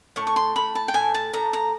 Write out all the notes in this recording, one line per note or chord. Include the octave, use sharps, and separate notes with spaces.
A2 C#6
C#6
C6
A2 B5
A5
G5
A2 G#5
A5
A2 A#5
A#5